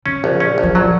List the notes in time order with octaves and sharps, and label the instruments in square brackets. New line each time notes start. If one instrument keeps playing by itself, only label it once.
[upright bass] C#3 [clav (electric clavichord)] C#4
[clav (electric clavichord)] A#1
C#4
A#1
[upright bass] F#3
[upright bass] F3 [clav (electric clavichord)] F#3